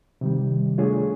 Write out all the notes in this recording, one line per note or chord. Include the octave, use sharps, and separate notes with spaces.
C3 D#3 G3
A3 D4 F4 G#4 C#5